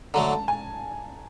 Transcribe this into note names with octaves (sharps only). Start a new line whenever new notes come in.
D3 F#3 A3 A#5
A5
G#5